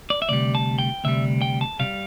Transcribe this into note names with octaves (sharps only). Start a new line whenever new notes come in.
D5
E5
D2 C3 G3 D5
A5
G5
D2 C3 G3 E5
G5
A5
C3 G3 F5